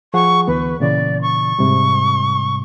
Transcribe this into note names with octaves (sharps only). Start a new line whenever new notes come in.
F3 G#4 F#5 C#6
D2 E3 B3 B4
A#2 C#3 E3 D5
C#6
G#2 C3 G3